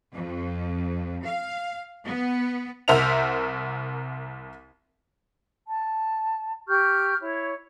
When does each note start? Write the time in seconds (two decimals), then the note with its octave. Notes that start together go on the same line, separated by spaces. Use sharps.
0.13 F2
1.25 F5
2.06 B3
2.88 C2 A#4 C5 E5 F#5 F7
5.67 A5
6.68 G4 C#6 F6 G6
7.21 E4 C#5